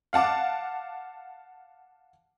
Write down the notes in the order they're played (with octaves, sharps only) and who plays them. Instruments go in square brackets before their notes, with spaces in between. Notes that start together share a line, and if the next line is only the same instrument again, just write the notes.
[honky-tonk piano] F5 F#5 A5 D6